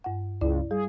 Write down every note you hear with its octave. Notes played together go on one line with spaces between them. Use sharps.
G2 F#5
C#2 E4 D5
G3 G#4